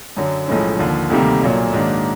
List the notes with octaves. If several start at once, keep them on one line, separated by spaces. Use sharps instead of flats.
F#2 D3 F#3
B1 A2 F3 G#3 C#4
D#2 D3 F3
D2 C3 D#3 G3 A#3
B1 A#2 F#3 A#3
G#2 D#3 F#3 A#3 D4